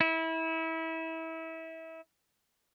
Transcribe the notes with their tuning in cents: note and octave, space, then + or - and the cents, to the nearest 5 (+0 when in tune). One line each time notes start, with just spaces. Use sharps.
E4 -25